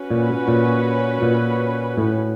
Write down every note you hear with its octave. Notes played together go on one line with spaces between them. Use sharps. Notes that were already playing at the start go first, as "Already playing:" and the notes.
Already playing: C#4 F#4 B4
A#2
A#2
A#2
A2